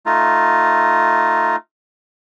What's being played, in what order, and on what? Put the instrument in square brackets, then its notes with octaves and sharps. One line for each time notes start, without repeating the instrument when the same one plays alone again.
[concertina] A3 D#4 F4